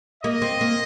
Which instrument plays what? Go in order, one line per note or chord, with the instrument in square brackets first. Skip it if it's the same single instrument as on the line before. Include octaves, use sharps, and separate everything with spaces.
[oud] A#3 [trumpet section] D#5
[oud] C4
A#3